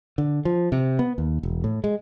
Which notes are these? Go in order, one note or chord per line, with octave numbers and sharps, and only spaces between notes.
D3
F3
C3
B3
D#2
E1
A2
G#3